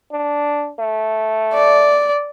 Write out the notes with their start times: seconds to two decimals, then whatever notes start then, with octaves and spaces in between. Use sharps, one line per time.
0.12 D4
0.79 A3
1.54 D5